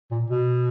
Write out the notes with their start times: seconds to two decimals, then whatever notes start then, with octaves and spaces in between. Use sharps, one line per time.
0.11 A#2
0.30 B2